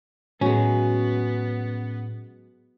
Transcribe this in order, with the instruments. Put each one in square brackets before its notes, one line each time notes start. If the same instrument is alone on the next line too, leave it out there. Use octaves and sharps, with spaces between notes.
[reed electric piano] A2 [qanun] F#3 G#3 [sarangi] B3 [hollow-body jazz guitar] C#4